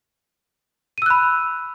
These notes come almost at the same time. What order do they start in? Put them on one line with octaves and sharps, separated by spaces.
D#7 E6 F#6 B5